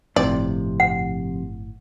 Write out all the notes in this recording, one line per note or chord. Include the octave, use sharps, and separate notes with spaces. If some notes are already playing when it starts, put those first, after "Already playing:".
G1 F2 A2 C3 D5
F#5